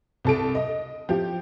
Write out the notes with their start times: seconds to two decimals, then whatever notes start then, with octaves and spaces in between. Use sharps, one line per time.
0.25 C2 A4 D7
0.55 D#5
1.09 F3 G4